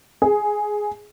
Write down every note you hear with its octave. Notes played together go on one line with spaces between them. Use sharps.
G#4